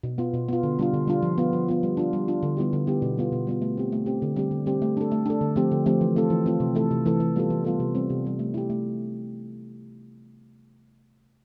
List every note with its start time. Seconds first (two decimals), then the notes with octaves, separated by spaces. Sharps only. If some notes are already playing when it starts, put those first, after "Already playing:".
0.03 B2
0.18 B3 F4
0.34 B2
0.48 B3 F4
0.63 D3
0.79 G3 D4 F4
0.93 D3
1.08 G3 D4 F4
1.22 F3
1.38 B3 F4
1.53 F3
1.68 B3 F4
1.83 G3
1.97 D4 F4
2.13 G3
2.28 D4 F4
2.43 D3
2.57 G3 B3 E4 G4
2.73 D3
2.87 G3 B3 E4 G4
3.02 B2
3.17 G3 B3 F4
3.32 B2
3.47 G3 B3 F4
3.62 A3
3.77 C4 G4
3.92 A3
4.06 C4 G4
4.22 D3
4.36 G3 C4 G4
4.51 D3
4.66 G3 C4 G4
4.82 A3
4.97 D4 A4
5.12 A3
5.26 D4 A4
5.41 D3
5.56 F3 A3 C4 G4
5.72 D3
5.86 F3 A3 C4 G4
6.01 E3
6.16 A3 C4 F4 A4
6.30 E3
6.46 A3 C4 F4 A4
6.60 C3
6.75 E3 A3 E4 A4
6.91 C3
7.05 E3 A3 E4 A4
7.20 E3
7.36 G3 B3 F4 A4
7.50 E3
7.65 G3 B3 F4 A4
7.80 C3
7.95 G3 C4
8.10 C3
8.25 G3 C4
8.39 A3
8.54 E4 G4
8.70 A3